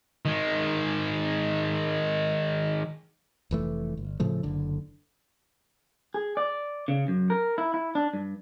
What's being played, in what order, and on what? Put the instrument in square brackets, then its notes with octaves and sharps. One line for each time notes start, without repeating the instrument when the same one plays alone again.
[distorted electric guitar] D#3 G#3
[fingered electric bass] F1 E3 A3
G1
A2 C#3 F3 A3
F#1 D3
[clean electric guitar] G#4
D5
C#3
F#2
A#4
E4
E4
D4
G2